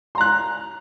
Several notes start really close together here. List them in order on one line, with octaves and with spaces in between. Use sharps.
C6 A#5 F#6